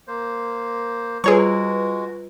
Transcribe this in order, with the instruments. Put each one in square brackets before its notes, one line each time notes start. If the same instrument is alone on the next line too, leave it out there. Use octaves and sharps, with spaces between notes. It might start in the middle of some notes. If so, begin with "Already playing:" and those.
[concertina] A#3 C5
[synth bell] G3 F4 B4 [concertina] G#3 F#4 [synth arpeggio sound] G#4 C#5 C#6